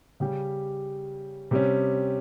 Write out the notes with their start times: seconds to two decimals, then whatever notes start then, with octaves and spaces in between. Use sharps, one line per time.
0.20 C#3 G3 C#4 G4
1.51 C3 G3 C#4